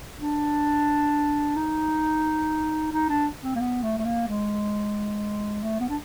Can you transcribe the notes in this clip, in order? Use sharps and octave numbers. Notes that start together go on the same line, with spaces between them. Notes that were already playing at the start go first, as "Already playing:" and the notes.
D4
D#4
D#4
D4
C4
A#3
B3
A3
A3
A#3
G#3
A3
B3
D4